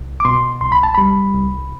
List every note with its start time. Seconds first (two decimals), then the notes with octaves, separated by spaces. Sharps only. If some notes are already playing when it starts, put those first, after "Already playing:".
Already playing: C2
0.20 D6
0.25 B2 C6
0.61 C2 C6
0.72 B5
0.83 A5
0.94 G3 B5
1.35 C2